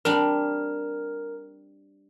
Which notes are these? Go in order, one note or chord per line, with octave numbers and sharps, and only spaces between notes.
G3 C4 D4 A#4